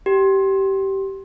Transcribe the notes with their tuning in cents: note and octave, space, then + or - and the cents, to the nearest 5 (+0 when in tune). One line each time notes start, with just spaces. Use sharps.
G4 -20